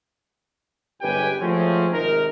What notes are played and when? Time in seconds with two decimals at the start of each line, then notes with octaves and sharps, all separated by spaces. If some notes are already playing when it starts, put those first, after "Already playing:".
1.01 G1 C#2 G4 B4 G5 G#5
1.40 F3 F#3 G#3 A3 C4 C#4
1.92 G#1 C3 D#4 A#4